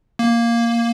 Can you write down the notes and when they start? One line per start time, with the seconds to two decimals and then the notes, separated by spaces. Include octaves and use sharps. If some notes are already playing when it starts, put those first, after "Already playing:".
0.19 A#3